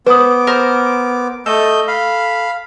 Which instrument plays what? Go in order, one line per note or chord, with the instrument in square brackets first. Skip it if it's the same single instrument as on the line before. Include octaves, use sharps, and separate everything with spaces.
[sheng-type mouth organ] B3 D6 [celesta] B4 D#6 [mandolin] C5
[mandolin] A#4 C5
[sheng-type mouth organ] A3 D#5 G6 [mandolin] A4
[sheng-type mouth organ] F5 B5